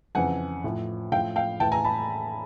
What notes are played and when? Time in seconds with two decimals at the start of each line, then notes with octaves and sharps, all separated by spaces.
0.15 F2 C#3 E3 F#5 G#5
0.64 A2 F3
1.12 A2 F3 F5 G5
1.36 F5 G5
1.60 A2 E3 G5 A5
1.72 G#5 A#5
1.84 A5 B5